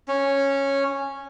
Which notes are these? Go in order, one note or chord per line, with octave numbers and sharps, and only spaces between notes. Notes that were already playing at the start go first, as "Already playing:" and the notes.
C#4